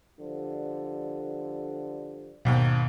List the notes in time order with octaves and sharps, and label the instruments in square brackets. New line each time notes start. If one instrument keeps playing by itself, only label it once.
[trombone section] D3 F3 G3
[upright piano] G#1 D#2 G5 [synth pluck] B2